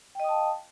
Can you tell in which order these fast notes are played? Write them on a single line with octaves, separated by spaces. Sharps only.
G5 D#5 D#6 A5 F5